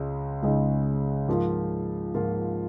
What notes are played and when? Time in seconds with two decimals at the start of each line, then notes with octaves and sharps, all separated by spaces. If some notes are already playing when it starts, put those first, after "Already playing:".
Already playing: C#2 C#3 G#3
0.42 C#2 C#3 G#3 D#4
1.28 G#2 F3 A#3 F4
2.14 G#2 F3 A#3 F4